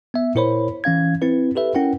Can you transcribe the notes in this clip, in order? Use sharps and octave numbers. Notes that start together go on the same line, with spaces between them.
B3 E5
A#2 E4 A#4 C5 C#5 B5
E3 C#4 F5 G#6
C4 E4 B4
G4 A4 B4 E5
C#4 E4 A#4 F#5 G5